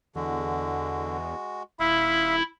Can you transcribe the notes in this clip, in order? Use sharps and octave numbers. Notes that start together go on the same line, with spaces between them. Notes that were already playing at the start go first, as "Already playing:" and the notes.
E2 D3 G#3 F#4
D#1 E4 E5 F5 C6 D#6